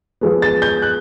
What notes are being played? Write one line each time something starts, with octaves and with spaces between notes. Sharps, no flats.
F3 G#3 B3
A6
G6
F#6